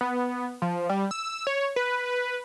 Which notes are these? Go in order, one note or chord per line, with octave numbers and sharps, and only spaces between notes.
B3
F3
G3
E6
C#5
B4